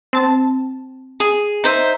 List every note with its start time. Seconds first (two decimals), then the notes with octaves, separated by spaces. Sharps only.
0.13 C4 A5
1.20 G#4
1.64 D#4 C5 E5